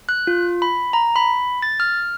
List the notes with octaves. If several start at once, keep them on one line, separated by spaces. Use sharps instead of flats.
F#6
F4
B5
A#5
B5
A6
F6